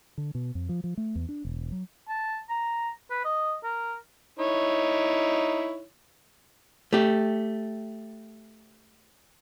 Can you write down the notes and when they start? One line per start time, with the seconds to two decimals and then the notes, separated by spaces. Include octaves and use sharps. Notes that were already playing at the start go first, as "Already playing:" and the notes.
0.18 D3
0.35 B2
0.55 F2
0.69 F3
0.84 F3
0.97 A3
1.15 E2
1.29 D4
1.45 E1
1.72 F#3
2.09 A5
2.50 A#5
3.10 B4
3.24 D#5
3.64 A#4
4.39 D#4 E4 C#5
6.93 A3 G4